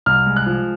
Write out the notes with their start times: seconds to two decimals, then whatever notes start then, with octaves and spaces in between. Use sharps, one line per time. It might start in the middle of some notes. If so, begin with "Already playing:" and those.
0.06 C2 F6
0.26 G#3
0.36 F#6
0.46 F3